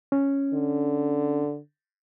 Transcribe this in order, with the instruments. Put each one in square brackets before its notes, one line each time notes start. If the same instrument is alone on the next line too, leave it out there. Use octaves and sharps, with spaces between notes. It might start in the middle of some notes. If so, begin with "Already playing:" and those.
[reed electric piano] C#4
[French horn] D3